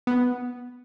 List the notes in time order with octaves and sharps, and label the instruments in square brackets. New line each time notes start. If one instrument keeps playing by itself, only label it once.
[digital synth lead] B3